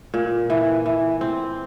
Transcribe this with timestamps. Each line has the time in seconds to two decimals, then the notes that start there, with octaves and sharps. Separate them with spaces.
0.14 A#2
0.50 E3
0.86 E3
1.21 C4